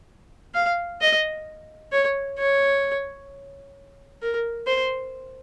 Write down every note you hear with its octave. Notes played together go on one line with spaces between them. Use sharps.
F5
D#5
C#5
C#5
A#4
C5